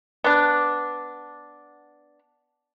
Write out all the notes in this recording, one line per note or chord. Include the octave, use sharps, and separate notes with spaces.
B3 D4